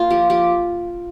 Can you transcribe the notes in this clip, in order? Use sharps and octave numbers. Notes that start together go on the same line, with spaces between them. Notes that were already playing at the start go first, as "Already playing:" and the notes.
Already playing: A#3 F4 C5
F3 G4
F3 G4